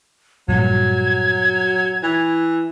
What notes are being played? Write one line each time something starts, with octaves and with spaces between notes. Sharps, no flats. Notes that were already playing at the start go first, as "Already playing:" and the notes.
G2 A#2 F3 F#3 G#6
E3